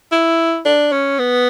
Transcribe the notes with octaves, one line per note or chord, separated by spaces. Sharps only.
E4
D4
C#4
B3